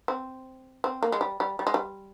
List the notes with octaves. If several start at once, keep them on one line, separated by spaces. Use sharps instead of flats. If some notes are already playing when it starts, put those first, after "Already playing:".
C4
C4
A#3
G#3
G3
G3
G3
G#3
G3